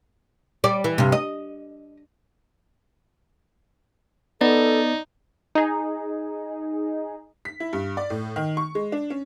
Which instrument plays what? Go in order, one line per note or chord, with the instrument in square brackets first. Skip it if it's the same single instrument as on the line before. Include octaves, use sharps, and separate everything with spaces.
[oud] G3 D5
E3
G2 C3
D#5
[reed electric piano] B3 [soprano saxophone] D#4 [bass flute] A4 [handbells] D5
[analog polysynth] D#4 G#4
[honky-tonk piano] B6
E4
G2
D5
A2
D#3
C#6
G#3
D4
C#4